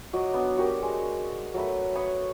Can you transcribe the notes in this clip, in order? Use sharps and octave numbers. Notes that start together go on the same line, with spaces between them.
F#3 F#4 D#5 D6
B3 D4
F#4 G4 A#4
G#3
F#3 A3 B4
B4 C#5 C#6 D#6